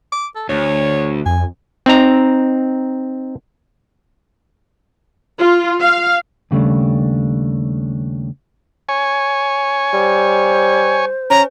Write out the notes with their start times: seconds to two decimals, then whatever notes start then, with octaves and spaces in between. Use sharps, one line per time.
0.13 D6
0.36 A4
0.49 D2 C#5
1.26 F2 G#5
1.86 C4 D#4 A#5
5.39 F4
5.81 F5
6.51 D#2 C#3 G3 A3 D4
8.89 C#5 G#5
9.93 G3 C5
11.30 C#4 A#5